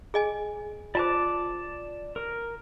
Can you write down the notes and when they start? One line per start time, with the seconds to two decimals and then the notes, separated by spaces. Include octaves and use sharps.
0.14 G#4 D#5 G#5
0.95 F4 C5 D5 A5 D6
2.16 A#4